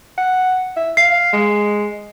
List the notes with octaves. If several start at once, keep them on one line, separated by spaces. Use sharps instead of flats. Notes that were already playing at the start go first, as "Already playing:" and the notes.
F#5
E5
F5 C7
G#3